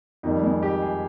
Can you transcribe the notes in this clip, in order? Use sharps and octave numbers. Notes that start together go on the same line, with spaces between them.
F2 D#3 G3 D#4
G#3
G4
G#4